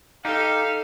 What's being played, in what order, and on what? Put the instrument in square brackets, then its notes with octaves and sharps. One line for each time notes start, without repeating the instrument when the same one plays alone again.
[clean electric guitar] D#4 G4 [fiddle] A4 [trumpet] F5